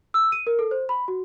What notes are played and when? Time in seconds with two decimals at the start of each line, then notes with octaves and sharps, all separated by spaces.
0.14 E6
0.32 D#7
0.47 A#4
0.59 A4
0.71 C5
0.89 B5
1.08 F#4